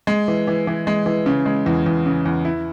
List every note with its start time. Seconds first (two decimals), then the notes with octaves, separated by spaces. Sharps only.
0.07 G#3
0.28 E3
0.47 E3
0.67 E3
0.87 G#3
1.06 E3
1.26 C#3
1.46 G#3
1.66 E2
1.86 E2
2.06 C#3
2.25 E2
2.45 E4